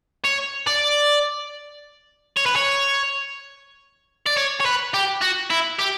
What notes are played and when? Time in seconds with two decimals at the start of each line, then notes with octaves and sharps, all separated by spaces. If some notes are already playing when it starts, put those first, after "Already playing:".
0.24 C#5
0.67 D5
2.37 C#5
2.46 B4
2.56 C#5
4.26 D5
4.37 C#5
4.60 C#5
4.65 B4
4.94 G4
5.22 F#4
5.51 E4
5.79 G4